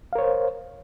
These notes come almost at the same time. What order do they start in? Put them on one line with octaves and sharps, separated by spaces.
F5 A#4 C#5 C5